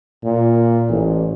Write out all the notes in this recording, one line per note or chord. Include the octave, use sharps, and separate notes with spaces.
A#2
A1